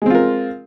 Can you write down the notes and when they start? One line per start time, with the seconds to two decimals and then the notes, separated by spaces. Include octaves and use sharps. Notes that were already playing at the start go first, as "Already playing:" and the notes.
0.02 G#3
0.06 C4
0.10 F4
0.15 A#4